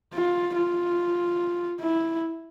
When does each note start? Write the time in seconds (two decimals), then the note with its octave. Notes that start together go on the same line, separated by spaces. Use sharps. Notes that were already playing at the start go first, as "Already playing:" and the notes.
0.14 F4
0.56 F4
1.81 E4